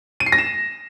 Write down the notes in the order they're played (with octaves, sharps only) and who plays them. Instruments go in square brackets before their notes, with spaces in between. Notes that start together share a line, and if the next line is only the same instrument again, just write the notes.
[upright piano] D#7
C7
A#6
E7